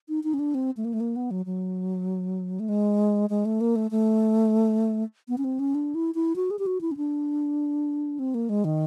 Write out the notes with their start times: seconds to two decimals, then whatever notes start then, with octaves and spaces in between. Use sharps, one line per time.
0.09 D#4
0.24 D#4
0.34 C#4
0.39 D4
0.55 C4
0.77 A3
0.85 A#3
0.93 A3
1.00 A#3
1.16 B3
1.31 F#3
1.46 F#3
2.60 A3
2.69 G#3
3.30 G#3
3.45 A3
3.61 A#3
3.76 A3
3.91 A3
5.29 B3
5.38 C#4
5.44 C4
5.59 C#4
5.75 D4
5.95 E4
6.15 E4
6.36 F#4
6.51 G#4
6.59 G4
6.66 F#4
6.81 E4
6.91 C#4
6.97 D4
8.19 C4
8.34 A#3
8.49 G#3
8.65 D#3